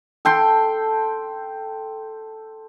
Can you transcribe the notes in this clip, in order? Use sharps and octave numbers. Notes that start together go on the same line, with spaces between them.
A4 G5 C6